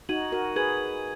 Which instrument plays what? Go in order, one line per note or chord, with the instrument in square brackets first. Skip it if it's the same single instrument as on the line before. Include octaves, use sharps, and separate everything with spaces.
[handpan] D#4 F#4 [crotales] G#6 D#7 F#7
[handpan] F#4 A#4
[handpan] G#4 B4 [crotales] G#6 D#7 F#7